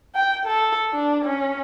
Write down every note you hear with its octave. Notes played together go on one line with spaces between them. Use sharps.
G5
A4
D4
C#4